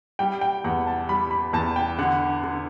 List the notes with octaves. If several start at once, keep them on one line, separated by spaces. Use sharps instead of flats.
G3 G5
G5
E2 F#5
A5
G3 B5
B5
E2 A5
G5
D3 F#5
D3